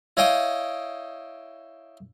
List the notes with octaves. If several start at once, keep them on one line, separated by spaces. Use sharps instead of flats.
E4 C#5 D#5 F5 G5 D#6